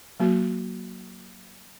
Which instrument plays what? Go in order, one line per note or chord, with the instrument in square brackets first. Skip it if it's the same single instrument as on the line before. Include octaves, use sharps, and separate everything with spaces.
[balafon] F#3 A#3 F#4